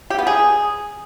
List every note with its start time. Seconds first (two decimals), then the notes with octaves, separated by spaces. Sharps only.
0.10 G4
0.19 B3
0.27 G#4